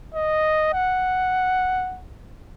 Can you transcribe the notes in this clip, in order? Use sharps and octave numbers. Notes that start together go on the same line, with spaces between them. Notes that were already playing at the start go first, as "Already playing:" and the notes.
D#5
F#5